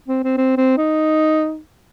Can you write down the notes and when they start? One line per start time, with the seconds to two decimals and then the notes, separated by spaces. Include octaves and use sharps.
0.08 C4
0.24 C4
0.38 C4
0.57 C4
0.77 D#4